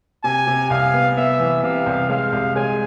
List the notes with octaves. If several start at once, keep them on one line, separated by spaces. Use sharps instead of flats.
C3 G#5
C3
C2 F5
B3
B3 E5
E3
C3 F5
C2
G#3 F5
C2
G#3 G#5